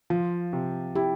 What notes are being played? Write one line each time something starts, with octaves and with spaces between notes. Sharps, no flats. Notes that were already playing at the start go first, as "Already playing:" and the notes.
F3 F4
C3
E4 G4